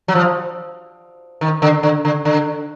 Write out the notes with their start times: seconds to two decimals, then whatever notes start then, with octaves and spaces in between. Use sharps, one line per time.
0.08 F#3
0.15 F3
1.41 D#3
1.62 D3
1.83 D3
2.05 D3
2.25 D3